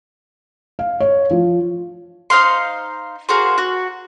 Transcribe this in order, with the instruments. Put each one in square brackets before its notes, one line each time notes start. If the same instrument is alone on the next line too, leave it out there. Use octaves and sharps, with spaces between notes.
[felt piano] F5
C#5
F3
[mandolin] D#4 C5 F5 C6
A#3 F#4 G#4 C5
F#4